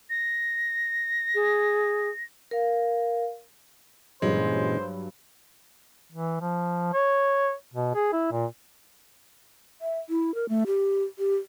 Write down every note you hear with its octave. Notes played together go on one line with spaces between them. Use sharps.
A#6
G#4
A#4 F5
G2 A#2 E3 F#3 G#3 C#4 C5
E3
F3
C#5
B2
G#4
E4
A#2
E5
E4
A#4
A3
G4
G4